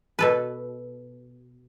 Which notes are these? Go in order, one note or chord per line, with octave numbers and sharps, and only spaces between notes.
B2 A4 B4